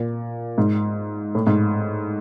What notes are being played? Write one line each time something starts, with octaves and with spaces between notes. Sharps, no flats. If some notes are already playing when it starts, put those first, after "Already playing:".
Already playing: A#2
G#2
A2
G#2